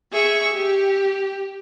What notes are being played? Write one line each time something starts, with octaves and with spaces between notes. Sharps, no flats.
G#4 E5 C#6
G4